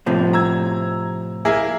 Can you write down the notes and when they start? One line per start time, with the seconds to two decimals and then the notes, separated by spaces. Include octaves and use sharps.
0.06 A2 C3 F3
0.33 A#5 E6 G#6
1.45 A#3 E4 G#4